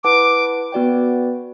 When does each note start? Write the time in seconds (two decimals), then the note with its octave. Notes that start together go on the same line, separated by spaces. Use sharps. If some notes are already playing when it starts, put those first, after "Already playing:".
0.04 E4 B4 F#5 A5 D6
0.72 B3 F#4 B4 D5 G5